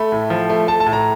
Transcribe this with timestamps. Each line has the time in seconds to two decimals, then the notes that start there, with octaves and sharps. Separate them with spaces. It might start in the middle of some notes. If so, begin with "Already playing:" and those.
Already playing: A3 B5
0.12 A2
0.30 F3
0.49 A3
0.68 A3 A5
0.80 A5
0.87 A2
0.93 A#5